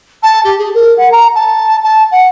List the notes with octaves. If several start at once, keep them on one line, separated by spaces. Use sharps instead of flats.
A5
G4
G#4
A#4
F#5
A#5
A5
A5
F#5